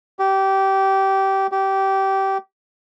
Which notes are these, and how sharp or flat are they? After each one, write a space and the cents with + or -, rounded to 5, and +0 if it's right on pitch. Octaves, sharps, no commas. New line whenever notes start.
G4 -20
G4 -20